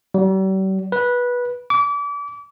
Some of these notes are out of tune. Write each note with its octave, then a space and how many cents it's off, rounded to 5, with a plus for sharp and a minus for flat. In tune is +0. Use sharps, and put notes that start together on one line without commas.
G3 -45
B4 -15
D6 -35